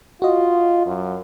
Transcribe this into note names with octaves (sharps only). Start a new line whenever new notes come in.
F4 F#4 D#5
F#2